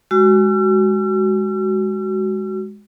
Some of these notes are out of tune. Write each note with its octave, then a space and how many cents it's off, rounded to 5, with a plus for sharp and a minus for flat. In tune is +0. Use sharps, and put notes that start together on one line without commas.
G#3 -5 F#4 +20 E6 +45